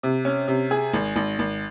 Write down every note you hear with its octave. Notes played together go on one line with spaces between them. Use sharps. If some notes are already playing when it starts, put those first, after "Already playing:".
C3
C#4
C3
G#4
G#1
G#1
G#1